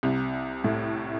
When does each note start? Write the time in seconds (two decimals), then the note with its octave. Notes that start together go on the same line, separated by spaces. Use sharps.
0.03 C2 C3
0.64 A2 A3